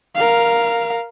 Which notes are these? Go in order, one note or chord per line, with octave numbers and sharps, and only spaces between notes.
A#4 F5